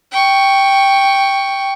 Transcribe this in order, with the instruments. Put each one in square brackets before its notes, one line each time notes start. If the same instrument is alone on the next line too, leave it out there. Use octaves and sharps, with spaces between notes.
[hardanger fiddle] G5 C#6